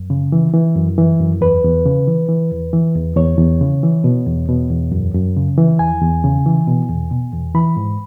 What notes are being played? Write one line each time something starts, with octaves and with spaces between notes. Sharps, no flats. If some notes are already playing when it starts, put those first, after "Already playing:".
Already playing: F#2
C#3
E3
E3
F#2
E3
F#2
E2 B4
E2
C#3
E3
E3
E2
E3
E2
E2 C#5
E2
C#3
E3
B2
E2
B2
E2
F#2
F#2
C#3
E3
E2 G#5
E2
C#3
E3
B2
E2
B2
E2
E3 B5
G#2